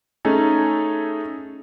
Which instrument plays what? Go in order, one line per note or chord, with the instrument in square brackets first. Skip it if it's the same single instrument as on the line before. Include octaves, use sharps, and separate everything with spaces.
[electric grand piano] A3 C#4 D#4 G#4 A4